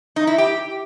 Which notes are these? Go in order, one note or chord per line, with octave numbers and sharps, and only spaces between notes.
D#4
E4
G4